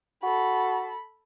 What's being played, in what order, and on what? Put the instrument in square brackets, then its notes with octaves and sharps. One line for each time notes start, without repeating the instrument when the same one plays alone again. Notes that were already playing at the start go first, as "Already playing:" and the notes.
[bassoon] F#4 [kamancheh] A4 B5